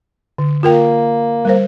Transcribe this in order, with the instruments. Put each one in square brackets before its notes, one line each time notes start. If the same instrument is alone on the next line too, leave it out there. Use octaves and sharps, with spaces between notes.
[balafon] D3
[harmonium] A#3 [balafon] F4 A#4 G5
[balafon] G3 A#4 C5